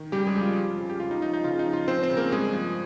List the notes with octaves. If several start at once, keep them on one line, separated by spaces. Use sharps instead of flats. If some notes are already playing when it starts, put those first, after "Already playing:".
Already playing: D#3
C#3 G3 G4
G#3 G#4
F2
F4
F3
C#3
G4
C#2 F4
D#4
F3 D#4
D#4
C#3 F4
D#4
F3
F4
F3 C4 C5
C4 C5
C#3
A#3 A#4
G2 G#3 G#4
F3